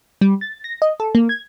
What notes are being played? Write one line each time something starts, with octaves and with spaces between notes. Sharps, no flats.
G3
A6
A#6
D#5
A4
A#3
G#6